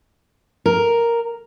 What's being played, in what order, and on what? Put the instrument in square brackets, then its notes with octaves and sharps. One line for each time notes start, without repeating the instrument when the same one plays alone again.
[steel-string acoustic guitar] A#4